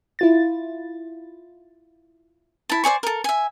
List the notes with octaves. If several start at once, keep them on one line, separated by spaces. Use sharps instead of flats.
E4 F4 A6
E4 A5
C5 D5 G#5 C#6
A4 A#4
E5 G#5